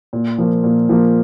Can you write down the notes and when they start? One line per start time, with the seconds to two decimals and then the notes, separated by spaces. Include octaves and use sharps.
0.13 A#2
0.38 F3 A#3
0.64 A#2
0.89 F3 A#3